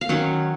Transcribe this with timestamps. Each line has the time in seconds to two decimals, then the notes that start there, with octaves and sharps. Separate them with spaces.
0.01 F5
0.09 D#3 F#3 C#4 F#5